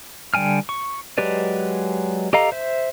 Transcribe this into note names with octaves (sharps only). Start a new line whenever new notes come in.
D3 G3 G5 G#5 F6
C#6
F#3 G#3 G4 B4 D5
G4 A4 D#5 F5 A#5
C5 E5